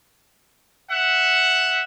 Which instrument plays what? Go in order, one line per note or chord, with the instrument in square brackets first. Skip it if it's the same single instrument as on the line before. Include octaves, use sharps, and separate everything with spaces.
[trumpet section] E5 F#5